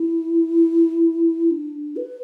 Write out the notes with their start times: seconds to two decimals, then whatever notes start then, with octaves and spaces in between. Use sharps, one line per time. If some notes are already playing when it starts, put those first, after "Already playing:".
Already playing: E4
1.51 D4
1.96 B4